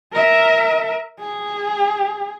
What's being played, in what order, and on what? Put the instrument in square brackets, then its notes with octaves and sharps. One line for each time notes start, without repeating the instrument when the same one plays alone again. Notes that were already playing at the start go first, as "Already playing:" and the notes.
[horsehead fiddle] A#4 E5
G#4